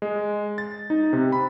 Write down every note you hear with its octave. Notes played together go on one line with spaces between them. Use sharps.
G#3
A6
D#4
C3
B5